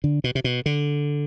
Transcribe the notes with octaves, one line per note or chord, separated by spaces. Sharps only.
D3
B2
C3
B2
D3